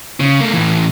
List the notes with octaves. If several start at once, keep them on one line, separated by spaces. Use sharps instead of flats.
C#3
A3 A#3
A2 E3